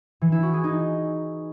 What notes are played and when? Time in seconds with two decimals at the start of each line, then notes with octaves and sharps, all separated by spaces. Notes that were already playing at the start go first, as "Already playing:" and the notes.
0.21 E3
0.32 E4
0.43 F#4
0.53 G#4
0.64 D#4